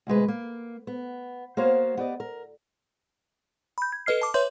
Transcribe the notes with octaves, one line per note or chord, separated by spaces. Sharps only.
D2 B2 G#3 B4
A#3
B3
A#3 B3 F#4 C5 C#5 F5
B3 G4 D5 D#5
A#4
B5 G6
G#6
A4 B4 D#5 F6 C7
A5 D6
B4 C#5 E5 C6 G6 F#7